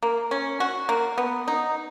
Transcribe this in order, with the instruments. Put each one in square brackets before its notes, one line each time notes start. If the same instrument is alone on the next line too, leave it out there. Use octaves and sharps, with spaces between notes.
[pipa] A#3
C#4
F#4
A#3
B3
D#4